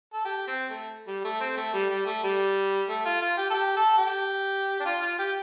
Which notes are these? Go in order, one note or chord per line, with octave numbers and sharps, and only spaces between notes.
A4
G4
C4
A3
G3
A3
C4
A3
G3
G3
A3
G3
A3
F4
F4
G4
A4
G4
A4
G4
D4
F4
F4
G4